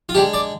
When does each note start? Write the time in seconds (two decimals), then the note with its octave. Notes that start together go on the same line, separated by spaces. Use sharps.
0.09 F4
0.15 D3 G#3 G4
0.34 D5